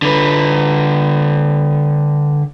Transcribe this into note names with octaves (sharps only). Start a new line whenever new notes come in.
D3 B4